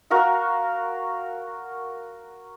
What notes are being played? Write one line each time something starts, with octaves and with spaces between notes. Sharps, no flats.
F#4 A#4 F5 F#5